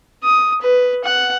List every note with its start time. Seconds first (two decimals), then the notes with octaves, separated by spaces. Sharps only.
0.24 D#6
0.62 B4
1.05 F#5